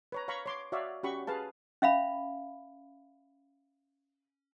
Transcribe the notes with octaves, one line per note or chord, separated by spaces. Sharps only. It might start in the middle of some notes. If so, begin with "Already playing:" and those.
B4 C#5 A#5
C#5 F5 A#5 B5 C#6
C#5 C6 D6
F#4 C#5 D5 E5 F5
C#4 F#4 G4 B5 C#6
G#4 B4 F5 A5
C#4 E5 F5 B5